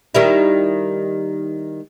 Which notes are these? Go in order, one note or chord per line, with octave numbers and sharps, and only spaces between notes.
D#3 G3 E4